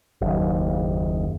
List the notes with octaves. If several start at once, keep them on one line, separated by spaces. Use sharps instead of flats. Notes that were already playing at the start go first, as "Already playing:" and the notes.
F#1 D#2